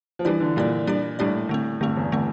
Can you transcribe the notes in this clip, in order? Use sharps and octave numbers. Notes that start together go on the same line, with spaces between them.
F3
E3 G3 D4 G4 D5
D3
A#2 G3 D4 G4 D5
G3 D4 G4 D5
A2 G3 D4 G4 D5
D3 A3 C4
G2 D3 A3 C4
E2
D3 A3 C4